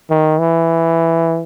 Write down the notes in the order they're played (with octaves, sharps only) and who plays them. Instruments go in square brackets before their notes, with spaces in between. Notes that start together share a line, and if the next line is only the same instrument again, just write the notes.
[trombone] D#3
E3